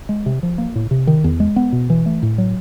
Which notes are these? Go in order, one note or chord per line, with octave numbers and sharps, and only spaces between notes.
G#3
C3
F3
A#3
A2
C3
D#3
E2
G#3
B3
B2
E3
A3
A2
F#3